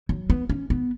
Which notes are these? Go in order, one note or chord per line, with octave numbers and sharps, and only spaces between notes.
F#3
B3
C#4
B3